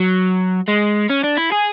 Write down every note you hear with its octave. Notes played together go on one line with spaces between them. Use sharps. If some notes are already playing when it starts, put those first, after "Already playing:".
Already playing: F#3
G#3
C#4
D4
E4
G#4